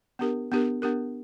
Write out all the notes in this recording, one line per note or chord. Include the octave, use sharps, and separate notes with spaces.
B3 D4 G4 A#4
B3 D4 G4 A#4
B3 D4 G4 A#4